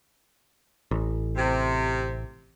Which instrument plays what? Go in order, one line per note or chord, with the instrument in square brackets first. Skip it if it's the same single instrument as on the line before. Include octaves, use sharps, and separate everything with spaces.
[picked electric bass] A1
[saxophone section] C3